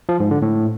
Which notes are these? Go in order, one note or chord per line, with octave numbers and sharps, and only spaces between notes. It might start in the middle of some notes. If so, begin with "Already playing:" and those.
F3
G#2
D3
A2